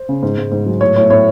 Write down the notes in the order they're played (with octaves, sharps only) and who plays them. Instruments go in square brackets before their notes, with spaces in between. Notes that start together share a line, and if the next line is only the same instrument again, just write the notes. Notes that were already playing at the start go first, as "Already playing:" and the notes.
Already playing: [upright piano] C5
C#3
G#2
G#2
G#2
F#3
A2 C#5
A2 C#5
A2 C#5